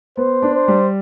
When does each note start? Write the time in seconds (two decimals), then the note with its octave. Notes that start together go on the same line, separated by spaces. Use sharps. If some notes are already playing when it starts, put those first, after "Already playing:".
0.17 B3 C5
0.42 D4
0.55 C5
0.68 G3